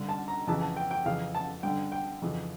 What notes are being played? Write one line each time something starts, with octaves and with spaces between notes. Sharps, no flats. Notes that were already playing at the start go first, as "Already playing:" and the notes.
Already playing: G2 D3
A5
A#5
F2 C#3 E3 A5
A5
G5
G5
F2 C#3 E3 F5
A5
G2 D3 G5
G5
F2 C#3 E3